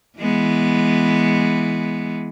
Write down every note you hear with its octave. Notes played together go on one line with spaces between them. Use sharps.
E3 G#3 B3